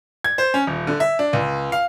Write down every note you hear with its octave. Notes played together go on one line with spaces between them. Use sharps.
G#6
C5
C#4
D#1
D3
E5
D4
C#2
F5